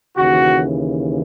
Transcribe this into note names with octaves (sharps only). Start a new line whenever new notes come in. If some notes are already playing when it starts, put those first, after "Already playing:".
D#2 C#3 E3 F#4